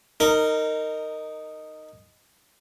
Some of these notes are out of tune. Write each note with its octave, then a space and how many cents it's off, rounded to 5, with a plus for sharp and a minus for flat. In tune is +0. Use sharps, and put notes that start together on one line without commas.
D#4 -5 A#4 -20